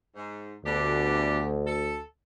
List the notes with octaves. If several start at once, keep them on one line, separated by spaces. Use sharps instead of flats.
G#2
D2 B2 D4 G4
A4